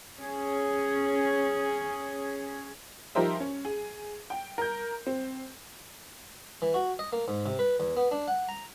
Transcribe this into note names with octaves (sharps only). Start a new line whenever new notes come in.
C#4 G#4
F3 D#4 G4 A#4 C5 E5
C#4
G#4
G5
A#4 G6
C4
E3
F#4
D#5
A#3
G#2
C3
B4
E2
B3
D4
F#5
A#5